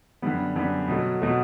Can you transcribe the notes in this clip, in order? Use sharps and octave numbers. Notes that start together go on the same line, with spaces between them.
F#2 D3 G3 B3
F#2 D3 G3 B3
B2 F#3 A3
B2 F#3 A3